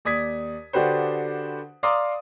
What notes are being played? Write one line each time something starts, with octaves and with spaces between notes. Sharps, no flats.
D#2 D5 D#6 G#6 B6
D3 D4 F#4 G4 B4 C5
D5 F5 A#5 C6 D6 D#6